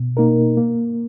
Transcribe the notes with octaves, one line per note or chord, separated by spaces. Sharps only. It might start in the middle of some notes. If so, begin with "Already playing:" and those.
Already playing: B2
A#3 D#4 A#4
A#3